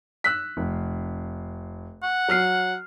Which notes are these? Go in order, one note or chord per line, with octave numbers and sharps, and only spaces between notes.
E6 F#6 B6
F1
F#5
F#3 F6 C7